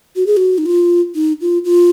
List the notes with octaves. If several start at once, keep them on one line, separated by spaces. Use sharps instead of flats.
F#4
G#4
F#4
D#4
F4
D#4
F4
F4